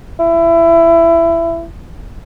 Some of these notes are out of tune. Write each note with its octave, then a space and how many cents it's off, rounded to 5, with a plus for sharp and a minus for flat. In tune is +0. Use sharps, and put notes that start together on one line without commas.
E4 +20